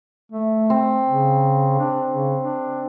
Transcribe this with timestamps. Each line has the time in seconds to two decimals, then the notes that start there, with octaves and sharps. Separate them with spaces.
0.32 A3
0.70 C4
1.09 C#3
1.79 D4
2.10 C#3
2.41 D4